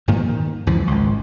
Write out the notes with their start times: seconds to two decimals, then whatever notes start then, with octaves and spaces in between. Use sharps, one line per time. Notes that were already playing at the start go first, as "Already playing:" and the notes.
0.08 G2 A#2 D#3 F3
0.28 D#3
0.67 C#2 F#2 E3 F3
0.87 G#1 C#2